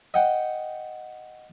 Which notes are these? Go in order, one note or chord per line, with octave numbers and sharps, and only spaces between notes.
D#5 F#5 G5